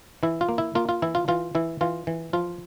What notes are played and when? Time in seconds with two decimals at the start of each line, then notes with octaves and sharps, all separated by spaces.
0.23 E3 E4
0.41 F4
0.49 A#3
0.58 E4
0.75 A#3 F4
0.89 F4
1.02 E3 E4
1.15 F4
1.28 E3 F4
1.55 E3 E4
1.81 E3 F4
2.07 E3
2.33 F3 F4